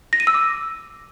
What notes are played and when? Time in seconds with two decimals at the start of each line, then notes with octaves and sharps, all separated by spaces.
0.13 A#6
0.20 D#7
0.27 E6
0.34 D6